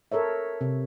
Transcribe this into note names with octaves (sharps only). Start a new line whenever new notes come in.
A4 A#4 C#5 E5
C3